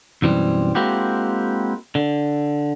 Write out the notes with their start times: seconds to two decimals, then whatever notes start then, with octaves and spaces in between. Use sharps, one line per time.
0.22 B1 F#2 E3 G3 C4
0.75 G#3 A#3 C4 E4 F#4 G4
1.95 D3